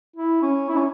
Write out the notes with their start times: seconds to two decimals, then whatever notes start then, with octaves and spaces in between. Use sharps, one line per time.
0.16 E4
0.42 C#4
0.69 E4
0.77 C#4